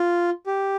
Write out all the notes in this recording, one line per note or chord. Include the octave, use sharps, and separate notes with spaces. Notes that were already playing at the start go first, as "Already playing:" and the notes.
Already playing: F4
G4